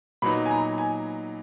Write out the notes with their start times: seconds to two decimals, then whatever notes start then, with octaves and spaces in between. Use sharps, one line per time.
0.22 A#2 F#3 B3 D#4 B5
0.46 G#5
0.51 A#5
0.78 G#5